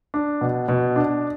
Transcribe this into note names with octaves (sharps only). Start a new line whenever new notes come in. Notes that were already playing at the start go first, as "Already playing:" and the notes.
D4
B2
B2
D4